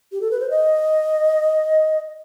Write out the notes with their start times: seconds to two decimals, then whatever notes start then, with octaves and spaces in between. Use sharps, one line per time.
0.12 G4
0.21 A4
0.31 B4
0.40 C5
0.50 D#5